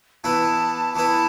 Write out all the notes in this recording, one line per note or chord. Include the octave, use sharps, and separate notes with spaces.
E3 B3 E4 B4 A5
E3 B3 E4 B4 A5